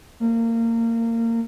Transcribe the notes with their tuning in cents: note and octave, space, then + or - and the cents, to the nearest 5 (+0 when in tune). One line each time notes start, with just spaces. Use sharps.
A#3 -25